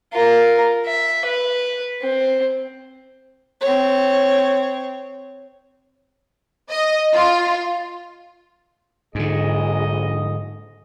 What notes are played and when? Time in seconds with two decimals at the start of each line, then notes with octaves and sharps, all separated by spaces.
0.13 F4 A#4
0.86 E5
1.25 B4
2.02 C4
3.61 C4 C#5
6.71 D#5
7.13 F4
9.15 A#1 G#2 D3 D#4 G#4 D#5